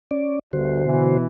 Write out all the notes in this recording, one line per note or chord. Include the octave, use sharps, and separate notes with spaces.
C#4 D5
G1 D2 D3 F#4 C5
B2 E3